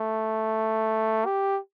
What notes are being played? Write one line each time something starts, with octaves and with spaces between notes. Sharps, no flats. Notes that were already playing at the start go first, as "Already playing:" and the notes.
Already playing: A3
G4